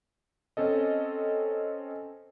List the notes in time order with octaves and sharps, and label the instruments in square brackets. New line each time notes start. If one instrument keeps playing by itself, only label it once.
[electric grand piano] C4 C#4 A4 D#5